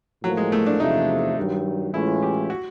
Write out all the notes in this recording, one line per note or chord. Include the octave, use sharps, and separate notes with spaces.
A2 F3 F#3 A#3
G#3
A3
D4
E2 C3 F3 A3 D#4
G2 D#3 F#3
A2 E3 G#3 C#4 E4 F4
G4
F#4